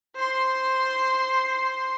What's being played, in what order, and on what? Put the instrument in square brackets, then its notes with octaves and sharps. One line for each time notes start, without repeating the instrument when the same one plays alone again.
[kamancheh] C5 C6